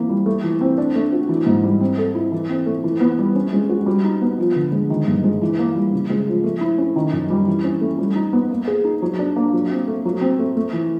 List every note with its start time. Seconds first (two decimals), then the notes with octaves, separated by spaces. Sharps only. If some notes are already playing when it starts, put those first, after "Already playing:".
Already playing: E3 A#3 C4
0.09 G3
0.26 A3
0.44 E3
0.61 C4
0.78 D4
0.95 A3
1.13 F#4
1.29 E3
1.46 G#2
1.63 G3
1.81 C4
1.98 A4
2.15 E4
2.32 E3
2.50 C4
2.66 A3
2.84 E3
3.01 B3
3.19 G3
3.36 C#4
3.53 G#3
3.69 F#4
3.86 G3
4.04 D#4
4.21 B3
4.38 F3
4.56 D3
4.72 G#3
4.90 D#3
5.08 G2
5.24 G#3
5.41 E3
5.59 A#3
5.76 G3
5.93 C#3
6.10 G#3
6.28 F3
6.44 A3
6.61 E4
6.78 C#4
6.96 D#3
7.13 F#2
7.30 G3
7.47 E3
7.64 C#4
7.81 A3
7.99 G3
8.15 D#4
8.33 B3
8.51 A#3
8.68 G#4
8.84 D#4
9.02 F#3
9.19 D4
9.36 A#3
9.53 F#3
9.71 C4
9.88 A3
10.05 F#3
10.21 C4
10.39 A3
10.57 A3
10.73 E3